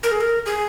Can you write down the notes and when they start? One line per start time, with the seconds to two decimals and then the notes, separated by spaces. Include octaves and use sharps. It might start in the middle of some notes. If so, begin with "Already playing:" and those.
0.03 A#4
0.11 G#4
0.21 A#4
0.46 G#4